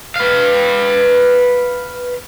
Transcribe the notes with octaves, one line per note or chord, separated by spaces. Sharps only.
B4 F5